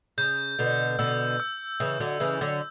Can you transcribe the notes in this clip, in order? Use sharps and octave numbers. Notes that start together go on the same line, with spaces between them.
C#3 G6
B2 D3
B2 D3 E6
E6
C#3 E3
D3 F#3
C#3 E3
D3 F#3